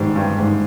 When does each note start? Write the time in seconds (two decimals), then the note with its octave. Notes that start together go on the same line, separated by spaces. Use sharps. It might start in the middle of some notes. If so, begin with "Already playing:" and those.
Already playing: G#2 D#3 G3
0.16 G2
0.38 G#2